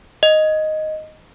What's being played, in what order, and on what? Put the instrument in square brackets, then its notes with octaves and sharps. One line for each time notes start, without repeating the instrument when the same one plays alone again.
[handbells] D#5